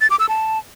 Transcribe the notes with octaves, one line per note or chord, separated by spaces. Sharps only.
A6
D6
E6
A5